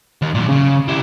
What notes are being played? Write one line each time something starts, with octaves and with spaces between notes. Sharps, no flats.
D#2 D#3
A#2 F#3
C#3
E4 G4